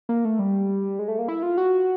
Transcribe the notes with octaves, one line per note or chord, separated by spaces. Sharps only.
A#3
A3
G3
G#3
A3
A#3
E4
F4
F#4